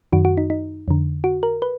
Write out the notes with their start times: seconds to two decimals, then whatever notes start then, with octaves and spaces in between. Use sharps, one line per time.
0.12 F#2 D#3 F#4
0.25 F#4
0.37 D#4
0.50 D#4
0.88 F2 D3
1.24 F#4
1.43 A#4
1.62 B4